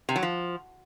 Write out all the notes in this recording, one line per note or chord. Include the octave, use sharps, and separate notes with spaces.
C3
F#3
F3